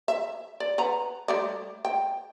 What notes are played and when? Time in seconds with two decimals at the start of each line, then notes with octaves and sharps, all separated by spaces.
0.08 E5
0.60 D5
0.78 B4 F#5 A#5
1.28 G3 A3 D5
1.85 G5